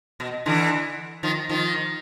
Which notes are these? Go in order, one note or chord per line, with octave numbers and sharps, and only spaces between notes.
B2
D3 E3
D#3 F3
D#3 F3